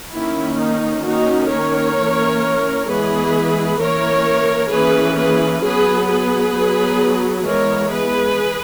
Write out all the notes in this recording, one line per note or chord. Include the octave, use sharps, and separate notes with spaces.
D#3 A#3 C#4 E4
D#4
D#3 A#3 C#4 D#4 F#4
A#4 C#5
E3 A#3 C#4
E3 G#3 B3 G#4 B4
E3 A#3 C#4 A#4 C#5
E3 A#3 C#4 G#4 B4
G#4 B4
F#3 B3 G#4 B4
G#4 B4
F#3 B3
E3 G#3 B3 A#4 C#5
G#4 B4